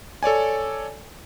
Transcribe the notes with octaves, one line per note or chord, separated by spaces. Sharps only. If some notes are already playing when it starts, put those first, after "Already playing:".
A4 C#5 D5 G#5